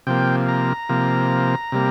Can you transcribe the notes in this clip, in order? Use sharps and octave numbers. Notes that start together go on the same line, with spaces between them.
C3 F3 A#3 G5
A#5
C3 F3 A#3
C3 G3 A#3